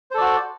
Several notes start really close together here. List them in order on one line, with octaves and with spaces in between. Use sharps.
C5 A4 D5 F#4